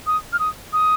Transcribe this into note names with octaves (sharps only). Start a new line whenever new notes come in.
D#6
F6
D#6
D#6